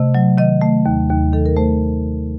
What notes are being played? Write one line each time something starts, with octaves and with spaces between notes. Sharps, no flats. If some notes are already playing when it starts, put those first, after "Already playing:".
Already playing: C3 A3 D#5
F#3
D#3 D#5
A3
D#2
D#2
D#3 A4
A#4
A3 C5